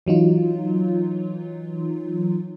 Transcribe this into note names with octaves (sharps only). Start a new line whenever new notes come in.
E3 F#3 D#4 F4